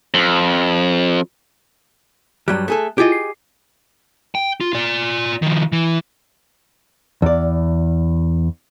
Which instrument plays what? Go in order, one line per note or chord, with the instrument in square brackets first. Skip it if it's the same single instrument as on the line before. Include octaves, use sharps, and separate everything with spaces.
[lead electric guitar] F2
[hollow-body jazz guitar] G2 F#3 G3 [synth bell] F#6
[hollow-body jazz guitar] A3 G#4 A4
[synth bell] E4 F4 [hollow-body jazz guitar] G4 G#4 D#5
[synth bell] C7
[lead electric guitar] G5
F4
F4 D5
D#3 F3
E3
[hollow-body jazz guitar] E2 D5